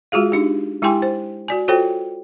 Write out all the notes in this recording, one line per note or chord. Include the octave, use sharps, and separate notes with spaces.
G#3 F4 F#4 G#4 F5
D4 D#4 G4
G#3 E4 G4 G5 G#5 C6
C5
F#4 D5 G#5
F4 F#4 A4 C5 C#5 G5